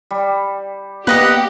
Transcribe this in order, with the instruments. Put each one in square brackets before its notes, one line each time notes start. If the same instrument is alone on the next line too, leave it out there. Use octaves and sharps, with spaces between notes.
[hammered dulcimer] G3
[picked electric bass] A#3 B3 [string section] G4 [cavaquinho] B4 D#5 F#5